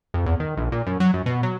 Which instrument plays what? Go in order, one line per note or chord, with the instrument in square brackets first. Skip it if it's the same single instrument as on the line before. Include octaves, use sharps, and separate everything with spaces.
[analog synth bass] F2
E2
D#3
A#1
A#2
F#2
F#3
F#2
B2
F#3